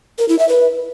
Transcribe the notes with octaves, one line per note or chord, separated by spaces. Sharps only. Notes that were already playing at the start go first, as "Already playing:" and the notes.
A#4
E4
E5
B4